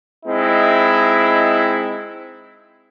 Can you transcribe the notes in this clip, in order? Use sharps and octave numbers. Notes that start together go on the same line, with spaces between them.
G#3 C4 D#4 E4